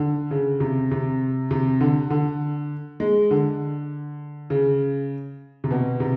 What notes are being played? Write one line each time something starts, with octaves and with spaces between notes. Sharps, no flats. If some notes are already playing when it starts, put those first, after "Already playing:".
Already playing: D3
C#3
C3
C3
C3
D3
D3
G#3
D3
C#3
C3
B2
C3